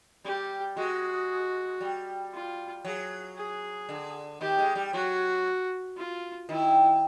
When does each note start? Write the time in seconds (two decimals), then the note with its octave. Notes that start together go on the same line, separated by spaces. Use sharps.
0.25 G3 G4
0.76 G#3 F#4
1.81 G3
2.33 F4
2.85 F#3 G#4
3.37 G#4
3.89 D3
4.40 D#3 G4
4.59 G#3
4.75 G3
4.93 F#3 F#4
5.96 F4
6.49 D#3 E4